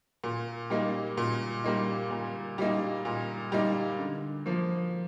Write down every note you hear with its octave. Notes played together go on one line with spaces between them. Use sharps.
A#2
G3 A#3 D#4
A#2
G3 A#3 D#4
A#2
G3 A#3 D#4
A#2
G3 A#3 D#4
D3
F3 A#3